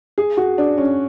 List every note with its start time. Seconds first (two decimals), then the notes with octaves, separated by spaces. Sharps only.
0.18 G#4
0.37 F#4
0.58 D4
0.78 C#4